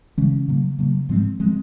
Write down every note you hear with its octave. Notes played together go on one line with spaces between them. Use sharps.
C#3 E3 G#3 C#4
C#3 F#3 A#3
C#3 F#3 A#3
G#2 F3 G#3 C4
F3 G#3 C4